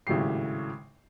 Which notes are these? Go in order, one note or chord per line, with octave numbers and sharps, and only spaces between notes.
G#1 A2 C#3 F#3 G4 C7